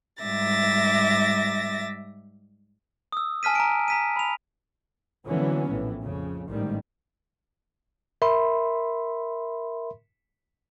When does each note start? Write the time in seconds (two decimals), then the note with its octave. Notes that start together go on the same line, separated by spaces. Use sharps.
0.23 G#2 G3 E5 D6 A6 A#6
3.12 D#6 E6
3.43 G#5 A5 F6 B6 D#7
3.55 A#5 D7
3.88 A#5 B6 D#7
4.16 B5 F7
5.27 D3 E3 F#3 A#3 B3 C#4
5.68 A#1 A2 E3
6.03 F2 C#3
6.49 A1 G#2 D#3 G3
8.22 A#4 E5 B5 C6